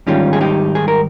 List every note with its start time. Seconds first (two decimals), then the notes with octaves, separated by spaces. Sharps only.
0.07 G#2 D#3 G3 C#4 F4
0.33 G#4
0.41 D#4 G4
0.75 G#4
0.88 A#4